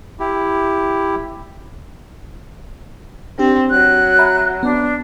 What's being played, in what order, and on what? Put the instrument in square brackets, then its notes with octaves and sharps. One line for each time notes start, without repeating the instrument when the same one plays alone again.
[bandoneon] E4 G4
[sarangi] C4 [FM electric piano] D4 G4
[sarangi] F#3 [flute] F#6
[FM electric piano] E5 A#5 B5
[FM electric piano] B3 [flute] D4